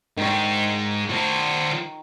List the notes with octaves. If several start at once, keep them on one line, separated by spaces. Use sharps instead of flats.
G#2 D#3 C#6
F#4 C5